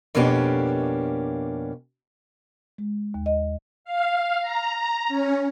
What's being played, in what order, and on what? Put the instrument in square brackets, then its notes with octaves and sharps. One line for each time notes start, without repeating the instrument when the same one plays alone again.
[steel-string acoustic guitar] F2 B2 A#3 C#4 D4 G4
[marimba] G#3
D#2
D#5
[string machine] F5
A#5
C#4